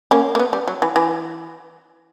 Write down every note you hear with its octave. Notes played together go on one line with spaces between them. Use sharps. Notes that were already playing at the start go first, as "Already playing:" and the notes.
A#3 C#4
A#3
B3
G3
F#3
E3
E3